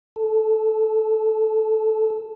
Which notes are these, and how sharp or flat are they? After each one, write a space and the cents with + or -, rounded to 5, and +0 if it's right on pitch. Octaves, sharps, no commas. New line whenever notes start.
A4 -10